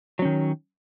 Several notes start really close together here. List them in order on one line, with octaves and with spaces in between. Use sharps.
F#3 C#4 D#3